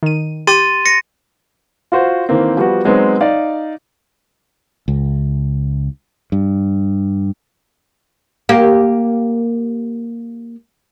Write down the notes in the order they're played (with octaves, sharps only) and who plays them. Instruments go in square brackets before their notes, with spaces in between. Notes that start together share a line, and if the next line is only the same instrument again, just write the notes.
[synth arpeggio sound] D#3 D#7
[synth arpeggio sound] G4 [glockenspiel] C6 A6 D#7
[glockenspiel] A#6 C#7
[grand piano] F4 F#4 C5
D#3 E3 A#3 C4
F3 G3 B3 F#4
F#3 G#3 B3 C4 D#4
D#4 D5 F5
[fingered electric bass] C#2
G2
[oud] A#3 G4